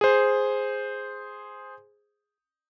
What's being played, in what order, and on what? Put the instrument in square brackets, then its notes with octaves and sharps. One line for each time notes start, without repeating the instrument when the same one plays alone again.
[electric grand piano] G#4 C5